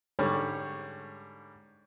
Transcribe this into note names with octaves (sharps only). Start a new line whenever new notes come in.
G#2 D3 G3 C#5